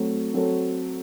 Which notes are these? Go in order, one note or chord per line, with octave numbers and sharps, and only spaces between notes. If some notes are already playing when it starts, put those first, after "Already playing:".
Already playing: F#3 A3 C4
F#3 C4 F#4 A4